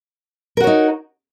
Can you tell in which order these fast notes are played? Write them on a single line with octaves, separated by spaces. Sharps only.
A#4 F#4 C#5 D#4